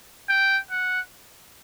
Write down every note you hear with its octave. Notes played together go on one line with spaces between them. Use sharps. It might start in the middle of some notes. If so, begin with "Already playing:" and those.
G5
F#5